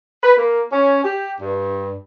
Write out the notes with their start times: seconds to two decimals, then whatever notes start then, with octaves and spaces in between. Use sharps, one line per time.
0.23 B4
0.38 A#3
0.72 C#4
1.05 G4
1.41 G2